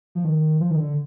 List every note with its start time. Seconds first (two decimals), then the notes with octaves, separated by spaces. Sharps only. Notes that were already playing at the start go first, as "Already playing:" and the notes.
0.15 F3
0.25 D#3
0.60 F3
0.70 D#3
0.78 D3